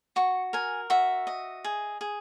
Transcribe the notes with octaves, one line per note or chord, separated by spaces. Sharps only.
F#4 C#6
A#4 G#5
F#4 E5
D#5
G#4
G#4